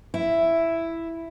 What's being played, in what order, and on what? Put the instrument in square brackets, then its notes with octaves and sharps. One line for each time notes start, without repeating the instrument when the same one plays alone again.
[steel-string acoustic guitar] E4